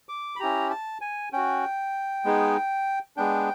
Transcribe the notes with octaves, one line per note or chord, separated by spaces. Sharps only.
D6
B5
C#4 E4 G4 A#5
A5
G#5
C#4 F#4 G5
G#3 B3 D#4 G#4
G#3 B3 D4 G5